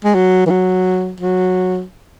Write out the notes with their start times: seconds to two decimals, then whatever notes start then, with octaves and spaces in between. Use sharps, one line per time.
0.04 G#3
0.14 F#3
0.46 E3
0.50 F#3
1.20 F#3